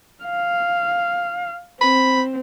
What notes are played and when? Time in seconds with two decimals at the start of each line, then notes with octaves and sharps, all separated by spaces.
0.24 F5
1.81 C4 B5